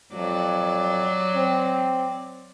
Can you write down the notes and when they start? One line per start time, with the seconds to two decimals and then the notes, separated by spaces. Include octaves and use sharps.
0.12 F2 F#3 D5
1.36 C4